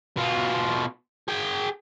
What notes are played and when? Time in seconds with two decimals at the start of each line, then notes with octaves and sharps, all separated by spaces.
0.17 B2 F4
1.28 G#4 G5